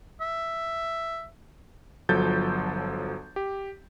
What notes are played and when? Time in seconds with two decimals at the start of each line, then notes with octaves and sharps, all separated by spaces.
0.21 E5
2.09 G1 F3 F#3 A4 G6 A6
3.36 G4